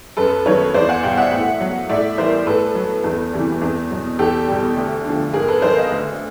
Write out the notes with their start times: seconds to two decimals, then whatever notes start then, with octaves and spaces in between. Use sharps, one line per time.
0.17 F#2 A4 B4
0.46 D#3 F#3 B4 C#5
0.74 E2 C5 D5
0.89 F#5 G#5
1.03 B2 G3 F5 G5
1.18 E5 F#5
1.32 A2
1.61 F#3
1.89 A2 D5 E5
2.18 E3 G3 A#4 C5
2.47 A2 A4 B4
2.75 F#3
3.04 E2
3.33 C3 E3 G3
3.62 E2
3.90 B2 F#3
4.19 E2 G4 A4
4.48 B2 G3
4.76 D2
5.05 D3 F3
5.33 G#2 G#4 A#4
5.48 A4 B4
5.62 D#3 F#3 A#4 C5
5.77 D#5 F5
5.92 D2